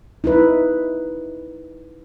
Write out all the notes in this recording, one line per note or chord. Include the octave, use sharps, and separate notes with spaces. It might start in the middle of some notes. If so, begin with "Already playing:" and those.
D#4 E4 B4